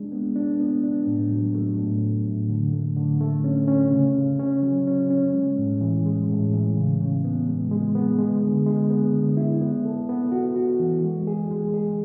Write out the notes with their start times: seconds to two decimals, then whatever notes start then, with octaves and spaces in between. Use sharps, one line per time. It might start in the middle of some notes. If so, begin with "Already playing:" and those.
Already playing: G#3 D4
0.12 B3
0.36 D4
0.60 B3
0.84 D4
1.07 A2
1.31 F#3
1.55 A3
1.79 A2
2.03 F#3
2.26 A2
2.49 D3
2.73 A3
2.96 D3
3.21 A3
3.44 C#4
3.68 C#4
3.91 C#3
4.16 C#3
4.40 C#4
4.62 F#3
4.87 C#4
5.10 C#4
5.34 G#3
5.58 A2
5.81 E3
6.06 G#3
6.29 A2
6.53 E3
6.77 C#3
7.01 C#3
7.24 B3
7.47 G#3
7.71 G#3
7.95 B3
8.18 G#3
8.43 D3
8.67 G#3
8.90 B3
9.14 D3
9.37 E4
9.61 B3
9.85 A4
10.09 B3
10.32 F#4
10.56 F#4
10.80 E3
11.04 G#3
11.27 G#4
11.51 G#3
11.74 G#4